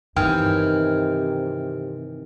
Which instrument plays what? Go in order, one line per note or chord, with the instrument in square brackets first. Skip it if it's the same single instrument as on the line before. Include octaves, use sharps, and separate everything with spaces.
[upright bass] G2 B3 [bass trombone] C3 [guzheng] D#3 E3 G#5 [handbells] G5 F6